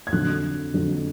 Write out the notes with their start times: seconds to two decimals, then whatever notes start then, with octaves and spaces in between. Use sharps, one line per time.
0.07 G#6
0.12 F2 D3 F#3 F#6
0.74 F2 D3 F#3